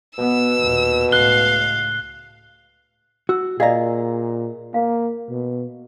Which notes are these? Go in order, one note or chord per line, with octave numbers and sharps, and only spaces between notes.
B2 B3 E6
D#2 A#2
C#2 A2 F5 F#6 G7
F#4 E6
A#2 G#4 D5 D#5 F5 A#5
A#3 F5
B2